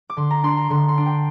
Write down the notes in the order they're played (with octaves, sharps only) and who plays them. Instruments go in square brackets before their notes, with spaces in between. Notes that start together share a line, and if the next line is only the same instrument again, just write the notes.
[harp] D6
D3 C6
A#5
D4 C6
A#5
D3 C6
C6
D4
G5